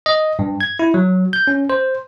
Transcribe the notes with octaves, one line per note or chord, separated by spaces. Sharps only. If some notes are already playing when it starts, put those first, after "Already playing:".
D#5
G2
G#6
E4
F#3
G6
C#4
C5